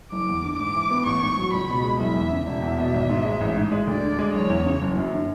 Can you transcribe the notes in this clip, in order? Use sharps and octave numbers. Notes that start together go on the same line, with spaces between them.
F#1 D6
E2
D3
G#2 D6
E3
B3
A1 C#6
G#2
F#3
C#2 B5
B2
G#3
F#1 E5
E2
C#3
E1 E5
E2
B2
G#1
G#2
G#3
A1
G#2
G#3
D2 D5
D3
G#3
F#1 C#5
E2
C#3
F#1
F#2
D3